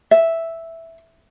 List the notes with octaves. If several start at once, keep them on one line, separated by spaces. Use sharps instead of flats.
E5